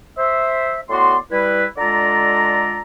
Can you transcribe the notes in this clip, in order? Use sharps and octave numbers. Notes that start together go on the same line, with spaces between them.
C5 E5
A2 B3 F#4 D5 C6
G3 E4 B4
D3 G#3 F4 A4 D5 A#5